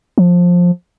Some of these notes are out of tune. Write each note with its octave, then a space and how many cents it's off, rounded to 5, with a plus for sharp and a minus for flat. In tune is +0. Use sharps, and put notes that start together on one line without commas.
F3 +15